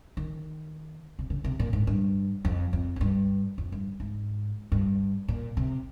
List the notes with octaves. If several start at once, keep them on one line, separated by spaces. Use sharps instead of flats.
D#3
C3
C#3
C3
A#2
G#2
G2
F2
F2
G#2
G2
F2
G2
G#2
G2
A#2
C3